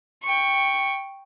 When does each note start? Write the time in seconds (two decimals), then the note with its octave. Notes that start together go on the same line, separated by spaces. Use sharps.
0.23 G5 C#6